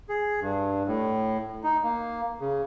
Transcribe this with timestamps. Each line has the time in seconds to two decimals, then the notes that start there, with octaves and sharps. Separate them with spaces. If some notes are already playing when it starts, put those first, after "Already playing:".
0.09 G#4
0.41 G2
0.87 A2
1.63 D#4
1.83 A#3
2.40 C#3